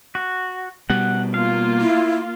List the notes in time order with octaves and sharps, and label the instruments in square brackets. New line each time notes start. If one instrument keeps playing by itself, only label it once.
[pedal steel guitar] F#4
[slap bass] B2 G3 [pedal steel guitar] F#5
[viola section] A#3 F4 [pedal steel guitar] F5
[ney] E4